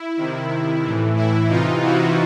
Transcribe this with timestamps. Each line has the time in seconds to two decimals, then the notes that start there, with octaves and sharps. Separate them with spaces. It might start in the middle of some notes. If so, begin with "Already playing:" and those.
Already playing: E4
0.17 C3 D#3
0.83 A2 E3
1.16 E4
1.49 C3 E3 D#4 F4
1.82 E4 F#4